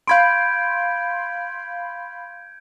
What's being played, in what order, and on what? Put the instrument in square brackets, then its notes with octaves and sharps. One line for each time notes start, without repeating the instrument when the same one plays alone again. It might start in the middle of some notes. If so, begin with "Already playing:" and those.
[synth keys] F5 B5 C6 [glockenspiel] G6 G#6 D7